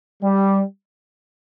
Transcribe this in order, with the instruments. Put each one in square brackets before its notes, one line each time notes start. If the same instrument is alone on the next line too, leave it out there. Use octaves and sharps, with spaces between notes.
[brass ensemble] G3